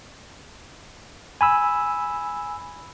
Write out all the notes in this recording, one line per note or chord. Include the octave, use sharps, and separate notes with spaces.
G#5 B5 E6